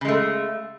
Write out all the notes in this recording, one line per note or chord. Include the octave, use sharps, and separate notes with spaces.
C#3 G#3 A3